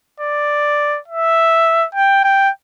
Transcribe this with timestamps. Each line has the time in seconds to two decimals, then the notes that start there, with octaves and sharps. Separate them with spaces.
0.20 D5
1.08 E5
1.95 G5
2.24 G5